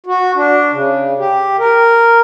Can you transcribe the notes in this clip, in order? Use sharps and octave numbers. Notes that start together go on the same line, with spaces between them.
F#4
D4
C#3
G4
A#4